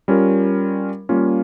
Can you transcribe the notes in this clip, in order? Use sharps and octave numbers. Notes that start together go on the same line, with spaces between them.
G3 C#4 F4 A#4
G3 A#3 C#4 F4